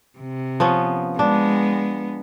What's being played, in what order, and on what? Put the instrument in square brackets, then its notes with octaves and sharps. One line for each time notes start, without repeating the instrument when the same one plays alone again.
[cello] C3
[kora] F3 B3 C#4
[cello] G#3 B3 [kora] D4